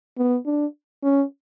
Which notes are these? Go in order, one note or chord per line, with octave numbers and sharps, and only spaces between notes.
B3
D4
C#4